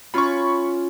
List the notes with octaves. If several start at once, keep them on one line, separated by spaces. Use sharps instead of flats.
C#4 F4 B5 C#6